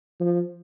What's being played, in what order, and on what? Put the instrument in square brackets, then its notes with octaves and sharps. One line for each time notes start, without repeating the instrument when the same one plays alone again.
[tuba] F3